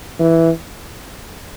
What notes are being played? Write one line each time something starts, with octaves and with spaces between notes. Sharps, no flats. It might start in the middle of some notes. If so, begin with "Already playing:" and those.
E3